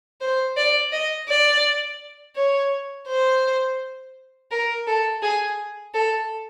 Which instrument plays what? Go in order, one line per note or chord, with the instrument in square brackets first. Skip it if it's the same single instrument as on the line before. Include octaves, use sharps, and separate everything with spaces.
[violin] C5
D5
D#5
D5
C#5
C5
A#4
A4
G#4
A4